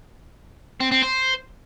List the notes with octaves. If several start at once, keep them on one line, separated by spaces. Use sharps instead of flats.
C4
C4
C5